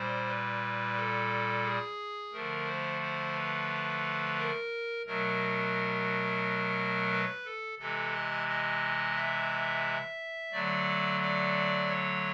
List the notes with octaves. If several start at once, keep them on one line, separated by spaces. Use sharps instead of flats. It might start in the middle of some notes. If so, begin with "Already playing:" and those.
Already playing: A#2 G3 C5
B4
A4
G#4
D3 F3 A3 A#4
C5
C5
B4
A#4
B2 F#3 A3 A#4
B4
A4
C3 E3 G#3 A4
D#5
D#5
E5
D3 F#3 A3 D5
D5
C#5